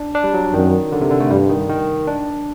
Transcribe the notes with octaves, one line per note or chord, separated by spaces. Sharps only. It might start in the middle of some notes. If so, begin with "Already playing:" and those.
Already playing: D4
D4
G3
F#3
F#2 D#3
D3
C3
D3
A3
G2 G3
D#3
D#3
D4